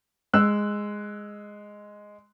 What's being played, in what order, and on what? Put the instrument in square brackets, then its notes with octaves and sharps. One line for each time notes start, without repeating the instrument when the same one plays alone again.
[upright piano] G#3 E6 F#6